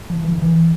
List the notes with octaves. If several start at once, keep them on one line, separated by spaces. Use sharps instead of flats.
F3
E3
D#3
E3